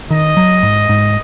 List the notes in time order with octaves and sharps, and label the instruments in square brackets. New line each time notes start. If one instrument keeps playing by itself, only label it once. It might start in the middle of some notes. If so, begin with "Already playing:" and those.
[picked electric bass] D#3 [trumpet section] D#5
[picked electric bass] F#3
G#2
G#2